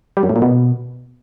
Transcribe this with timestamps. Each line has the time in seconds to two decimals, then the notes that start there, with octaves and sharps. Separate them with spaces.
0.17 G3
0.23 F#2
0.29 A2
0.36 A#2
0.42 B2